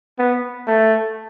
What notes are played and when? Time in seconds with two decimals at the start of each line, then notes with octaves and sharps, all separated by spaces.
0.19 B3
0.68 A3